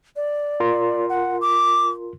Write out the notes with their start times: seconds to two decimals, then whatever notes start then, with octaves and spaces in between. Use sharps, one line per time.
0.16 D5
0.60 F4 A#4 C6
1.09 F#5
1.41 D6